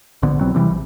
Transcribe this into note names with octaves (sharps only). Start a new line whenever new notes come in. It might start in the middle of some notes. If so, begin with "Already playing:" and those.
A#1 G#2 D3 B3
C2 B2 F#3 C4
C3 E3 F3 G3
A#1